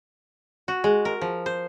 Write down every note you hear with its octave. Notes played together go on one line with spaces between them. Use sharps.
F#4
G#3
A#4
F3
C5